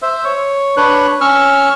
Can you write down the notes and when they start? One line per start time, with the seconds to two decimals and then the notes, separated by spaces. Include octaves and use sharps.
0.02 C5 E5
0.24 C#5
0.77 D4 B4 C#5 F#6
1.21 C#4 C#6 E6 F6